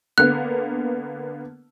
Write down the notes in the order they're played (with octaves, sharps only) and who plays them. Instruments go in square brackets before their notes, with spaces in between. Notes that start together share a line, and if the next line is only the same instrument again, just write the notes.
[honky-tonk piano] D3 A#3 B3 [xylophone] F#6